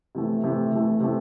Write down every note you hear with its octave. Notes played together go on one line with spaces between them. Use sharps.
C3 E3 A3
C3 E3 A3
C3 E3 A3
C3 E3 A3